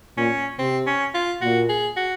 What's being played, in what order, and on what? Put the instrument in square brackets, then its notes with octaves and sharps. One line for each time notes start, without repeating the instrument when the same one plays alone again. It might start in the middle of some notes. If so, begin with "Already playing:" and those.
[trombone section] A#2 [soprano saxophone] C#4
[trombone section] C3 [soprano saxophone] C4
[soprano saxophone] C#4
F4
[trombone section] A#2 [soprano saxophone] F#4
[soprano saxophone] G#4
F#4